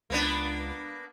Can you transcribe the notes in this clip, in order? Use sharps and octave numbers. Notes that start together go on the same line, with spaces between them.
C#2 A#3 B3 D4